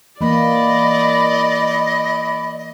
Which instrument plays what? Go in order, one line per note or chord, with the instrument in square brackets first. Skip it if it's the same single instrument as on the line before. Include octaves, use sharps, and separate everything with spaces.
[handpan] E3 A#3 [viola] D5 [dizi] D#5 [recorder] B5